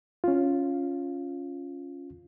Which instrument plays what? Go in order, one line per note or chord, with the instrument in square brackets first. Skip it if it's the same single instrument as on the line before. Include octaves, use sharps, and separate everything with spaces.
[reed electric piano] C#4 F4